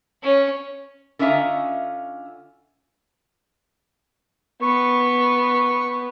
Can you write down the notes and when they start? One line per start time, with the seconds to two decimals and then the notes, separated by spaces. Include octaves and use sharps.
0.23 C#4
1.19 D3 C#4 F4 D#5 E5 A#5
4.62 B3 C#6